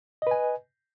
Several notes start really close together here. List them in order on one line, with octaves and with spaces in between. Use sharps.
D#5 B4 G#5